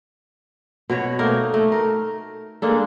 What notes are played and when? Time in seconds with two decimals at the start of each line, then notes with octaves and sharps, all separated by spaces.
0.90 B2 F#4 C#5
1.19 A3 A#3 D#4 A#4
1.54 A3
1.72 A#4
2.62 G#3 A#3 D4 A4